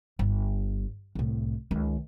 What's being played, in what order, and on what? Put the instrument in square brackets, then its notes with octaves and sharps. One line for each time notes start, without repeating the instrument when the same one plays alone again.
[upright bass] G1
C2 A2
C#2 D#3